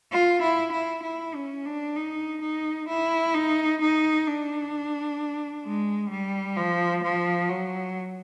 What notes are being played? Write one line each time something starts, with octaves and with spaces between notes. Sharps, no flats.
F4
E4
E4
E4
C#4
D4
D#4
D#4
E4
D#4
D#4
D4
G#3
G3
F3
F3
F#3